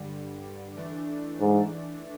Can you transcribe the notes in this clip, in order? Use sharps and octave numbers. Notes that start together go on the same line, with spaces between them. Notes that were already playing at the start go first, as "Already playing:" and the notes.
Already playing: G2 D3 G3
E3 A3 D4
G#2